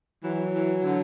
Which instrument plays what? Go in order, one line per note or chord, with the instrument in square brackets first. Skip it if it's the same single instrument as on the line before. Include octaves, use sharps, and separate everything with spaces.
[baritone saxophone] E3 [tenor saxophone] F#3
[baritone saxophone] E3
D3